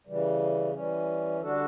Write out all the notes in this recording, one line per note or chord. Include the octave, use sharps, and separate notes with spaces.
C#3 E3 G3
E3 G3 C#4
D3 G3 D4 F#4 A4